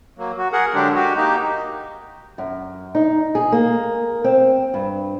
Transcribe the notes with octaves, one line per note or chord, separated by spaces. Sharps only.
F#3 A#3
F#4
G#4 A#4 F#5
D3 F#3 G#3 D4 G4
F#4 G4
A#3 D#4 G4
F#2
D#4
G#4
A#3
C4
G2